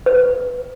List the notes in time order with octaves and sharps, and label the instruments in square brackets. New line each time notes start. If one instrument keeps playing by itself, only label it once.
[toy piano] B4